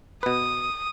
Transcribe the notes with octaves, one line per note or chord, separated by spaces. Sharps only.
B2 B4 D#6